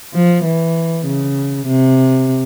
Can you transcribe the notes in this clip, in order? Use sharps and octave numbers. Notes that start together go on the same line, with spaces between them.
F3
E3
C#3
C3